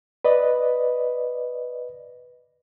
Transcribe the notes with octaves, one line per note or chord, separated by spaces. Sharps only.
B4 D5 D#5